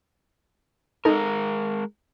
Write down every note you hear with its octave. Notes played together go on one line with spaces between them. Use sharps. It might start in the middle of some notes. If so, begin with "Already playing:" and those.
G#3 D#4 A4 A#4